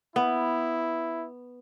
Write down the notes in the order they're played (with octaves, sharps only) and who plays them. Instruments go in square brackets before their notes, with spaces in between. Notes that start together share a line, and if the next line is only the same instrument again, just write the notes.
[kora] B3 [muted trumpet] E4